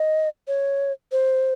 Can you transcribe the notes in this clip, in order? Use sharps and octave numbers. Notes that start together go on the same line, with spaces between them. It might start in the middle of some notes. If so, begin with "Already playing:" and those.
Already playing: D#5
C#5
C5